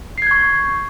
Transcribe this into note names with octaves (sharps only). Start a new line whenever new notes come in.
C#6 G6 G#6 C7